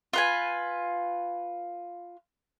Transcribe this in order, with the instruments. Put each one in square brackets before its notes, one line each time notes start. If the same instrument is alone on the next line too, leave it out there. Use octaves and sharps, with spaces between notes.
[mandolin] F4 B4 G#5